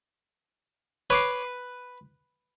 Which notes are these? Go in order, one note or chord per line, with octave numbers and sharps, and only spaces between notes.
B4 C#5 D6 C7